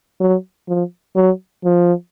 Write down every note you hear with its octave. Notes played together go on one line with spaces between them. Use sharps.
F#3
F3
F#3
F3